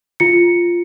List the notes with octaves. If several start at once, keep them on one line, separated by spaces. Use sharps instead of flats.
F4 C#7